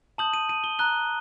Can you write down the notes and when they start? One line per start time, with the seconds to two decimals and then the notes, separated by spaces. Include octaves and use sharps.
0.18 A5 D#6 G6 F#7
0.33 D#7
0.49 D#7
0.64 G7
0.79 A#5 F#6 G7